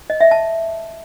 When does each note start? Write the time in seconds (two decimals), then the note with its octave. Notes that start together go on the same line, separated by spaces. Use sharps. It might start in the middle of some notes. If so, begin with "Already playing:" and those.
0.10 D#5
0.21 E5
0.31 A5